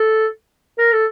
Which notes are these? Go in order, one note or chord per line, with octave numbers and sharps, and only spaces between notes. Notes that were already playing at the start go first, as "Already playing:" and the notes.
Already playing: A4
A#4
A4